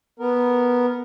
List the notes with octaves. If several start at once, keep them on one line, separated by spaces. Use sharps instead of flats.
B3 A#4